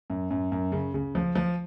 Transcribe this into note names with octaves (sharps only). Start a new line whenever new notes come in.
F#2
F#2
F#2
C#3
C#3
F3
F3